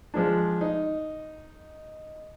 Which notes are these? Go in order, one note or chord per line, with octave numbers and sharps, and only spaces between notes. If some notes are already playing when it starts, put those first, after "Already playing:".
F3 G#3 D4
D#4